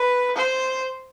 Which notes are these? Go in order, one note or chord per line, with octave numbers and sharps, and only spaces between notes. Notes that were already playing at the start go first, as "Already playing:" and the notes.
Already playing: B4
C5